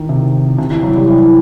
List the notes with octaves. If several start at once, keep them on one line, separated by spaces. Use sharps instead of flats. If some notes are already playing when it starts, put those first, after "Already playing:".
Already playing: D#3
C3
C3
E3
F#3
G3
E3